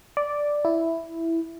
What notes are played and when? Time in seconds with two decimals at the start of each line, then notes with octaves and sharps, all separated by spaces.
0.17 D5
0.65 E4